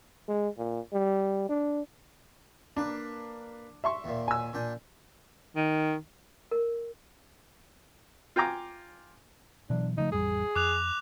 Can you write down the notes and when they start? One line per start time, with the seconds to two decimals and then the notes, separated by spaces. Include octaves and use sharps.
0.28 G#3
0.58 A#2
0.93 G3
1.49 D4
2.77 A#3 D4 B4
3.84 E5 C6 C#6
4.04 D#2 A#2
4.28 G#5 E6
4.53 A#2 D4 G5
5.56 D#3
6.51 A#4
8.36 F4 G5 G#5 A#5 D6
9.70 B2 E3 F#3 D4
9.98 C#3 F3 A3 D#4
10.12 A1 F2 G3 G#4
10.56 F2 D6 F#6 F7